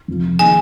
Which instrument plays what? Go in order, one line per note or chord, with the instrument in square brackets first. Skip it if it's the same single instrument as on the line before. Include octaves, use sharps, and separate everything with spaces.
[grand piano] F1 F2 F3
[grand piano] D#3 A#3 G#4 D#5 [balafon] G#5